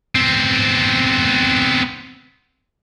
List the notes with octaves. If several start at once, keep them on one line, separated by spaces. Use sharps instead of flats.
B3 C4